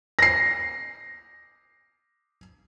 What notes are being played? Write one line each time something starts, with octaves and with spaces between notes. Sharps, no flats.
A#6 C7